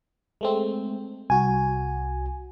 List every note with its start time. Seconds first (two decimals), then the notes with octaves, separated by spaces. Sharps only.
0.41 G#3 A3 C4
1.30 C2 F#4 G#5